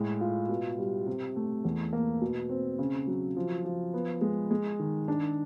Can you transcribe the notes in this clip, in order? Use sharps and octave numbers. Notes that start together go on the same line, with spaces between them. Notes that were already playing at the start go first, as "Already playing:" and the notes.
Already playing: A2 G#3
F4
B2
G3
C3
A3
E2
A#3
B2
C4
C#3
F#3
F3
F3
B3
G#3
G#3
D#3
D4